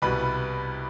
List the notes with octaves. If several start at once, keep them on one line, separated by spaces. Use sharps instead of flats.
C2 B2 G3 B4 B5